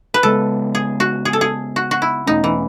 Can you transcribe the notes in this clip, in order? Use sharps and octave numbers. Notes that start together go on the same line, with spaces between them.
B4
C#3 G#3 B3 A4
G#4
F#4
G#4
A4
G#4
F#4
F#4
E4
E2 B2 A3 C#4 D#4
E3